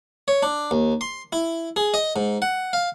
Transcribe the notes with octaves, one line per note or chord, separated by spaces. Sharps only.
C#5
D4
D#2
C6
E4
G#4
D#5
G#2
F#5
F5